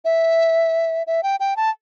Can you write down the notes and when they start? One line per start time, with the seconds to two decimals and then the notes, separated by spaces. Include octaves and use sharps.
0.05 E5
1.07 E5
1.23 G5
1.40 G5
1.57 A5